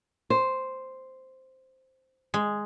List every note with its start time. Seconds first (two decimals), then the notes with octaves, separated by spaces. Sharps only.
0.30 C5
2.34 G#3